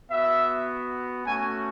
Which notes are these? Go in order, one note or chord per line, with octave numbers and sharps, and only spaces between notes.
B3 F#4 E5
A3 C#4 F#4 G#5